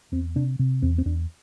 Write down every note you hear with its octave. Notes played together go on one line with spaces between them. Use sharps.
E2 C4
C3 D4
C3
E2 C4
C4
E2 D4